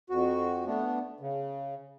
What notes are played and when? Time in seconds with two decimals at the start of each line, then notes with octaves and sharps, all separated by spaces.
0.10 F2 F#4
0.66 A3 B3 D4
1.20 C#3